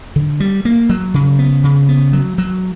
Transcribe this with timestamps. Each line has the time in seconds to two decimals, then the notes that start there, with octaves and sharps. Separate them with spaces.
0.16 D3
0.40 G3
0.65 A#3
0.90 F#3
1.14 C#3
1.39 B3
1.64 C#3
1.89 B3
2.13 F#3
2.38 F#3